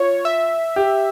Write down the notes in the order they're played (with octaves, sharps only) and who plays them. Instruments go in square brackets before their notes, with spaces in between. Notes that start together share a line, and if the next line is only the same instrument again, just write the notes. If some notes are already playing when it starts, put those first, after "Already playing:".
Already playing: [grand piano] F4 [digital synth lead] C#5
[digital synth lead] E5
[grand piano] G4